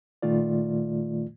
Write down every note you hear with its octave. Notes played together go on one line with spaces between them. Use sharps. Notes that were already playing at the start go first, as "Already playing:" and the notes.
A#2 D#3 A3 F4 D5